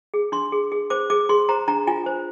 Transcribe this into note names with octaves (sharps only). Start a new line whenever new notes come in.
G#4
D4 C6
G#4
G#4
C5 D6
G#4 D6
G#4 C6
C5 A#5
D4 A#5
F4 G#5
C5